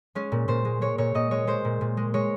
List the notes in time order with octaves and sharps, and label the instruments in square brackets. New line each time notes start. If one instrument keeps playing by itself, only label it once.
[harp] G#3 C#4
A#2
A#2 C5
G#3
G#3 C#5
A#2 C#5
A#2 D#5
G#3 C#5
G#3 C5
A#2
A#2
G#3
G#3 C#5